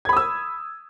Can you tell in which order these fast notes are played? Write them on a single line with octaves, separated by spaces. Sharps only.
G#6 B5 D#6 E6